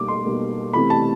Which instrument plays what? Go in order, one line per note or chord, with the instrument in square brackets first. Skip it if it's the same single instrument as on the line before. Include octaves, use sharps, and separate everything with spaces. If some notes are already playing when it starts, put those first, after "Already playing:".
Already playing: [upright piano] B2 G3 A#3 D#4 D6
C6
B2 G3 A#3 D#4
C3 E3 A3 B5
A5